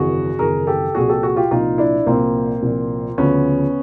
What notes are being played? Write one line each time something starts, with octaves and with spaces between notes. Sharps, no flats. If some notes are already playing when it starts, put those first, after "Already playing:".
Already playing: G#1 F#2 C#3 E3 F#4 G#4
G#1 F#2 C#3 E3 G#4 A#4
G4 A4
C2 A#2 F3 F#4 G#4
G4 A4
F#4 G#4
F4 G4
C2 A#2 F3 D#4 F4
D4 E4
C2 A#2 F3 A#3 C4
C2 A#2 F3
D2 C#3 F3 B3 C#4